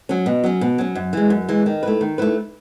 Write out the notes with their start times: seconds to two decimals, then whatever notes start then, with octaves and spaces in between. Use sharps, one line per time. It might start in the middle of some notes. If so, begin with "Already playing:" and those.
0.09 F#3 C#4
0.26 B2
0.44 F#3 C#4
0.61 B2
0.78 F#3 C#4
0.95 F#2
1.13 E3 G#3
1.30 F#2
1.49 E3 G#3
1.66 D#3
1.83 A3 E4 B4
2.01 D#3
2.18 A3 E4 B4